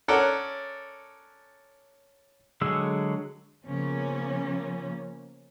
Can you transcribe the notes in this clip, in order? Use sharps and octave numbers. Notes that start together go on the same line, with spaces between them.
C#4 A4 A#4 D5 F#5
D3 F#3 G#3 G#4 E6
C#3 F3 A#3 B3 C#4